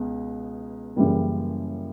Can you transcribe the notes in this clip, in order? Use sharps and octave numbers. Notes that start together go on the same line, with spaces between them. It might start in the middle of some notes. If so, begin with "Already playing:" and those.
Already playing: C#2 B2
F#2 C#3 E3 G3 A#3